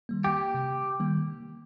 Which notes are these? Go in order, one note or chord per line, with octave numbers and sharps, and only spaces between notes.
D#3 G3 A#3
G4
C3
D#3 G3 A#3